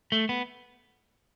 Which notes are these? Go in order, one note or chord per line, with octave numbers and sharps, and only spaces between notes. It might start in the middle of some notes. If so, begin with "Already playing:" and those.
A3
B3